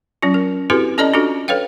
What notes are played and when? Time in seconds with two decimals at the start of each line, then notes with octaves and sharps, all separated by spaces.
0.22 F#3 C#4 F4
0.34 A#4
0.70 C4 E4 F#4 G4 A4 B4
0.98 C#4 A4 D5 D#5 A5 A#5
1.14 D4 F4 F#4 A4
1.48 A4 B4 C#5 F5 G5